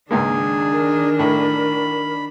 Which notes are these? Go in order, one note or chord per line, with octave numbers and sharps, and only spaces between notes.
C#2 G#2 D#3 A#3 D4 G#4
A#4
A2 B5